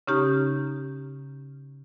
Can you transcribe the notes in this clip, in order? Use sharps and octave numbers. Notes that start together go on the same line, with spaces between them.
C#3 C#4 D#4 G4 A#5 F6